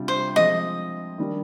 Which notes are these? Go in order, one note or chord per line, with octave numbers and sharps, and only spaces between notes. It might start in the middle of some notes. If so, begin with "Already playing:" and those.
Already playing: C3 G3 D4 F4
C5
F3 G#3 C4 D#5
D#3 G3 D4